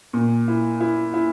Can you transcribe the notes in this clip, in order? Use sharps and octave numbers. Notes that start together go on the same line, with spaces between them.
A#2
E4
E4
E4